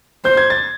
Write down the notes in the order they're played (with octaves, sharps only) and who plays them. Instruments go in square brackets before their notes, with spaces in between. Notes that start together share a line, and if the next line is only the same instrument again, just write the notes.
[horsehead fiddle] C5 [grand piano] G6
[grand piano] G#6
A6